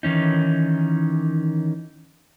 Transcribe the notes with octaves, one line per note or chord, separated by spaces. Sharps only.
D#3 E3 C#4 D#4